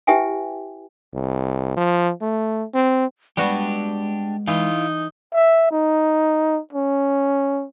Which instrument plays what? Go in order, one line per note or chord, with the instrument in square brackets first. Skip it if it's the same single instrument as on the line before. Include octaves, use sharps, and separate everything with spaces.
[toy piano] E4 G4 B4 E5 G5 G#5
[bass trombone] C2
F3
A3
C4
[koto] G3 B3 F#4 [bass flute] G#3 [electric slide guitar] D4 G4
[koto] E3 [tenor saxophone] D#4 [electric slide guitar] E4 F5
[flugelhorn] E5
D#4
C#4